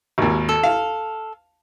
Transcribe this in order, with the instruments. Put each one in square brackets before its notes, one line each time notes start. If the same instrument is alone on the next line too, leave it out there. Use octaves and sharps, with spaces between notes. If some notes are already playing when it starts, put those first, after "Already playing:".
[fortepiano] G#1 D#2
[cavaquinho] A4
[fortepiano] F5